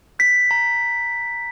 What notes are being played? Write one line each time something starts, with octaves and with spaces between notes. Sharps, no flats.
G6 B6
A#5